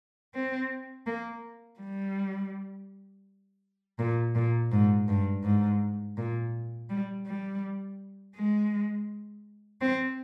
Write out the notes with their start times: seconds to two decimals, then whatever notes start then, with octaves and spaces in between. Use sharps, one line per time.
0.34 C4
1.07 A#3
1.80 G3
3.99 A#2
4.35 A#2
4.72 G#2
5.08 G2
5.44 G#2
6.17 A#2
6.90 G3
7.26 G3
8.36 G#3
9.81 C4